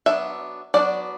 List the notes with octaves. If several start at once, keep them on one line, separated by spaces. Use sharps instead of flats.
F#3 B3 D4 E5
F#3 B3 D4 D5